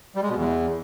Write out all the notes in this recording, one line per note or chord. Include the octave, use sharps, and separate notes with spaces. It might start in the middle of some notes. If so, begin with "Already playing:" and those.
G3
G#3
B2
E2